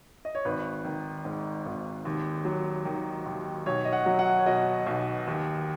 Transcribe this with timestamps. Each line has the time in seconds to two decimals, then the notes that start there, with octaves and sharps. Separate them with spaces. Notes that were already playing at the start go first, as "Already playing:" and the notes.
0.25 D#5
0.35 C#5
0.45 G#1 B4
0.85 D#3
1.25 G#2
1.66 G#1
2.05 D#2
2.45 F#3
2.85 D#3
3.26 D#2
3.66 B1 C#5
3.85 D#5
3.93 F#5
4.06 F#3
4.19 F#5
4.39 C#5
4.46 B2 D#5
4.87 B1
5.27 D#2